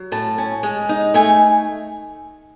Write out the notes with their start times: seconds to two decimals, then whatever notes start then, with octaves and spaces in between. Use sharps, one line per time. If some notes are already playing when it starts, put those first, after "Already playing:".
Already playing: F#3
0.12 A2 A5
0.38 C#4
0.63 G#3
0.89 D#4
1.14 A3 G#5